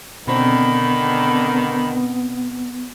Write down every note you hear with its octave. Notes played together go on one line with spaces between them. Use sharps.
B2 D3 D#3 B3 C4 B5